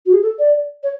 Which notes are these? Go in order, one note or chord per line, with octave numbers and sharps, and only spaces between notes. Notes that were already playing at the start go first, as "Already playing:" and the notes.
F#4
G#4
A4
D5
C#5